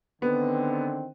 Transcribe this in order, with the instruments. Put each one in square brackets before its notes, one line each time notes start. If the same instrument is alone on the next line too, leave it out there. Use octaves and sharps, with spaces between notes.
[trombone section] D3 D#3 C4 [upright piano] B3